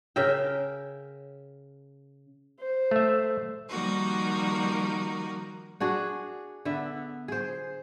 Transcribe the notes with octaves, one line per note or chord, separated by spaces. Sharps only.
C#3 A#4 E5 G5
C5
A3 E5
D#3 F3 G3 A#3 D#4 F#4
D4 F#4 G#4
D3 B3 E5
G#4 C5